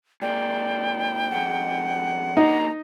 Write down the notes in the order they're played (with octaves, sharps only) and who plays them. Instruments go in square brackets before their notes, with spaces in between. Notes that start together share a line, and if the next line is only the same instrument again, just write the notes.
[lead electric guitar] G#2 A#3 [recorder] D5 [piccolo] G5
[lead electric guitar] F2 G#2 [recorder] F#5
[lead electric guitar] D3 A#3 [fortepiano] D#4 [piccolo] A#5